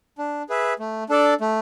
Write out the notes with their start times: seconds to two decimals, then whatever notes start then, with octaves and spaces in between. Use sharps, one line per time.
0.18 D4
0.49 G#4 B4 E5
0.79 A3
1.09 D4 A4 D5
1.41 A3